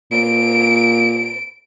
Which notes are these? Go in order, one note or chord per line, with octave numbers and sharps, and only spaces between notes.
A#2 D7